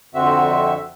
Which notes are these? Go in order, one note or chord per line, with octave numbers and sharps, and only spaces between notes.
F2 D3 C4 F#4 E5